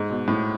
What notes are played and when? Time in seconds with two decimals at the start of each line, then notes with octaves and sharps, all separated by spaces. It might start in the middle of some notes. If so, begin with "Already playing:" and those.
Already playing: G#2
0.10 B2
0.28 A2